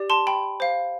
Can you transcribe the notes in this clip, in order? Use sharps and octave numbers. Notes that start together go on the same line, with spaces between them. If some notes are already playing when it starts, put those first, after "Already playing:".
Already playing: G4 D5
A5 C6
G5 B5
C5 F5